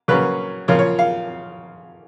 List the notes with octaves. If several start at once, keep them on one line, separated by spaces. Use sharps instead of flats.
C#3 F#3 A#3 C#4 B4
C#3 F3 A#3 F4 C#5
C#5
F5